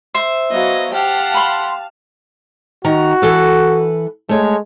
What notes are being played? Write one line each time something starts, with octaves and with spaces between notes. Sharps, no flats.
C5 E5
F#3 B3 D#5 F5
G4 F5 F#5 A5
B5 C6
D#3 F#4 A#5
E3 A4 B4
G#3 A3 C#5